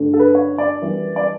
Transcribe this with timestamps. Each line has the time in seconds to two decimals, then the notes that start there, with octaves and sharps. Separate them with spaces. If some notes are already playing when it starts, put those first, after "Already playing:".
Already playing: G2 D3 A3 C#4
0.14 A4
0.19 B4
0.35 C#5
0.58 D5
0.81 F#2 E3 G3 B3
1.16 D5